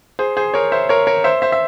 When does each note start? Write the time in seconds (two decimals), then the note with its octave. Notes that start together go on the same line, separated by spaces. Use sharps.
0.19 G#4 C5
0.37 G#4 C5
0.54 A#4 C#5
0.72 C5 E5
0.89 A#4 C#5
1.07 A#4 C#5
1.24 C5 E5
1.42 C5 E5
1.52 E5